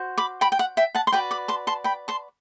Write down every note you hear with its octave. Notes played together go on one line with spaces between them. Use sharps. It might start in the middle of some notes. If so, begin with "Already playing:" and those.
Already playing: F#4 C5
B5 D6
G5 B5
G5
F#5
E5 G5
F#5 A5
C6
F#4 B4 D5 G5 B5
B5 D6
A5 C6
A5 C6
G5 B5
A5 C6